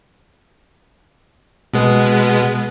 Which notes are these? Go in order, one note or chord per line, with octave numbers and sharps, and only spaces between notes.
B2 G#3 B3